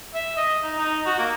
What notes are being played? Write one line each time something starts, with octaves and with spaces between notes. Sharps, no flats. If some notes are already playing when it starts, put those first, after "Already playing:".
E5
D#5
D#4
D#4
F#4
A#3